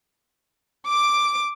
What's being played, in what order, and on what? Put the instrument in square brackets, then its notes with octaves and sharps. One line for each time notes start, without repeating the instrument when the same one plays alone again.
[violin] D6 D7